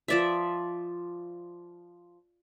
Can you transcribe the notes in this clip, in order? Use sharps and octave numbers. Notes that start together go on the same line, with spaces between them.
F3 D5 E5